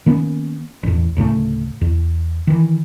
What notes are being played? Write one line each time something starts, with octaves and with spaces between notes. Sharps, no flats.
D#3 A#3 B3 C#4
A1 E2
D1 A2 C#3 A3
E2
D#3 E3